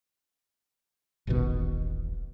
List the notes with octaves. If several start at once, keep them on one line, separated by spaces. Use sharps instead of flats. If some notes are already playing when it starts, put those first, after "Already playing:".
D#1 A1 D#2 B2